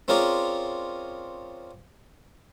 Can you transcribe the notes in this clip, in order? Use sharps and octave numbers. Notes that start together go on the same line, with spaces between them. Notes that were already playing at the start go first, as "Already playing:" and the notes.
C4 C#4 F4 G#4 A#4 D5